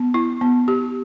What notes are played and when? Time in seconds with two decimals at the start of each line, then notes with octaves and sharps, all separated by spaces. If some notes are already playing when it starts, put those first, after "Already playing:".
Already playing: B3
0.14 E4
0.41 B3
0.68 G4